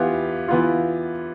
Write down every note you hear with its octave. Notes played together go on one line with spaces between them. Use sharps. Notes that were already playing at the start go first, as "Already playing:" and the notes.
Already playing: E3 B3 F4 G4 F5
E3 B3 F4